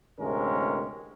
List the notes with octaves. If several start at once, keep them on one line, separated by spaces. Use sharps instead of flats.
A1 D2 C3 G#3 C#4 A#4